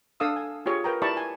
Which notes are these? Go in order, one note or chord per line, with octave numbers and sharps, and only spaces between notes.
D4 A4 F5 D#6 E6
G#5
F4 G4 G#4 C#5
A#4 B4 G5 A#5
E4 G4 D5 A5 B5 C#6
G#5